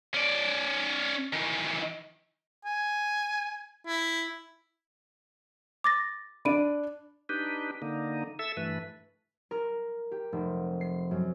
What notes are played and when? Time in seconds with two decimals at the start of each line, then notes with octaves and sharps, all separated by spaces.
0.14 C#4 D5
1.33 D#3 E3
2.65 G#5
3.86 E4
5.84 D6 A6 A#6
6.45 D4 D5 B5 D7 D#7
7.29 D4 D#4 G4 B4
7.82 D3 A#3 D#4
8.39 A4 E5 E6
8.57 G2 E3 A3 B4
9.51 A#4
10.12 G4
10.33 F1
10.81 C7
11.11 F#2